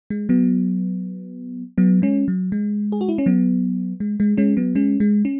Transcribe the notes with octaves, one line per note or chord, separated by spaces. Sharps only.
G#3
F#3 B3
F#3 B3
G#3 C#4
F#3
G#3
G#4
F#4
E4
C#4
F#3 B3
G#3
G#3
G#3 C#4
F#3 B3
G#3 C#4
G#3
C#4